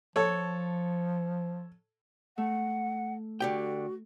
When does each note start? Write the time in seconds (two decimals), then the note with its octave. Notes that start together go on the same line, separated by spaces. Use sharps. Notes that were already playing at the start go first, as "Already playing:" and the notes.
0.16 F3 A4 C#5
2.38 A3 F#5
3.40 D3 F#4 G4 G5